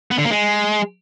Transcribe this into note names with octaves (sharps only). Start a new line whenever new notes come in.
B3
D3
A#3
G#3